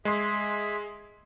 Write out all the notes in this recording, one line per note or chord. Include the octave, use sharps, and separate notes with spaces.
G#3 G#4 E5 C6